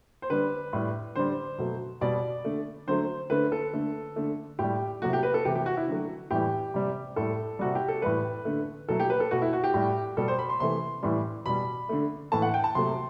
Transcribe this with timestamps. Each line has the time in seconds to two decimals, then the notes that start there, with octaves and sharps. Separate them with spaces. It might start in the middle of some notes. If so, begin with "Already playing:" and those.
0.22 C5
0.30 D3 G3 B4
0.73 A2 G3
1.16 D3 G3 C5
1.58 B2 F#3 A3
2.01 B2 G3 D5
2.45 D3 A3
2.87 D3 F#3 A3 C5
3.30 D3 A3 B4
3.52 A4
3.73 D3 A3
4.16 D3 A3
4.59 A2 G3 G4
5.02 C3 F#3 A3 F#4
5.13 G4
5.23 B4
5.34 A4
5.45 C3 E3 A3 G4
5.55 G4
5.66 F#4
5.77 E4
5.87 D3 F#3 A3
6.31 A2 E3 G3 G4
6.74 C3 G3
7.16 A2 G3 A4
7.59 C3 G3 F#4
7.75 G4
7.88 A4
8.02 A2 E3 G3 B4
8.45 D3 A3
8.88 B2 F#3 A3 A4
9.00 G4
9.10 B4
9.20 A4
9.31 B2 A3 F#4
9.42 E4
9.53 F#4
9.64 G4
9.74 A2 G3
10.17 B2 G3 A4
10.28 C5
10.39 B5
10.49 C6
10.60 C3 E3 A3 C6
11.03 A2 E3 G3
11.46 B2 G3 B5
11.89 D3 A3
12.32 A2 E3 A3 A5
12.42 F#5
12.54 G5
12.64 A5
12.75 C3 F#3 A3 C6